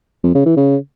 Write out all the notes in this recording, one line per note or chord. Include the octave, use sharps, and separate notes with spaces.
F2
C#3
E3
C#3